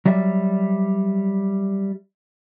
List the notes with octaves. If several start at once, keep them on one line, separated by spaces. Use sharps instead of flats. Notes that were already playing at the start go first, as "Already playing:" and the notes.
F#3 G3 D5 E5